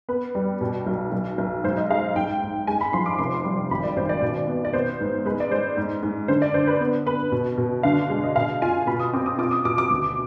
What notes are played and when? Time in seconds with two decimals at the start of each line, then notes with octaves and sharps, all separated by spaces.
0.09 B3 B4
0.35 G3
0.61 B2
0.87 B1
1.12 B1
1.38 B1
1.64 G#2 C5
1.77 D#5
1.90 G#3 F5
2.15 G#2 G5
2.42 G#2
2.67 G#3 G#5
2.81 B5
2.93 F3 C6
3.06 D6
3.18 F1 C6
3.44 G3
3.71 G#1 B5
3.83 D5
3.96 G#1 C5
4.09 D5
4.22 B2
4.48 B3
4.65 D5
4.73 B3 C5
5.00 G#2
5.26 G#3 B4
5.40 D5
5.51 G#3 C5
5.77 G#2
6.03 G#2
6.28 D3 C5
6.42 D5
6.54 D3 C5
6.67 B4
6.81 B3
7.06 B3 B4
7.32 B2
7.57 B2
7.83 D3 F5
8.09 G#3
8.24 D#5
8.36 B2 F5
8.62 F4 G#5
8.87 B2 B5
8.99 D#6
9.13 C4 D6
9.26 D#6
9.39 F4 D6
9.51 D#6
9.65 B2 D6
9.78 D6
9.91 D2